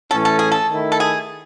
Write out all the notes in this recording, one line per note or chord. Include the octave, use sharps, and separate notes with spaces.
A2 E3 A3 C#4 A4
A4
G#4
A4
D#3 A3 E4
A4
G#4